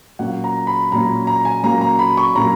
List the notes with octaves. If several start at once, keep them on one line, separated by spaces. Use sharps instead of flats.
A#2 F#3 A#3 C#4 F#5
A#5
B5
A#2 F#3 A#3 C#4 A#5
A#5
G#5
A#2 F#3 A#3 C#4 A#5
A#5
B5
C#6
A#2 F#3 A#3 C#4 A#5